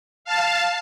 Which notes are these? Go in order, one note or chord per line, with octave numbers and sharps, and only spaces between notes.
F5 A5